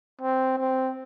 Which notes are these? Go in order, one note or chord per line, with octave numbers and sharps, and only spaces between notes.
C4
C4